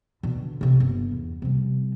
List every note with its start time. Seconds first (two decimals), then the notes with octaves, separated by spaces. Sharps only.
0.23 B2 D3
0.61 C3 C#4
0.80 G1
1.11 E2
1.42 C3 G3